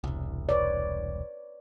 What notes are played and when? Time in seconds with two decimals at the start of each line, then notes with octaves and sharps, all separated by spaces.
0.04 E1 C2
0.49 B4 C#5 D5